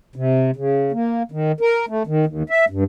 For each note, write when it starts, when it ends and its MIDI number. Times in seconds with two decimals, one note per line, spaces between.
0.16 0.51 48
0.56 0.92 49
0.92 1.23 58
1.32 1.52 51
1.60 1.86 70
1.88 2.03 57
2.07 2.25 51
2.26 2.43 39
2.50 2.65 76
2.70 2.84 43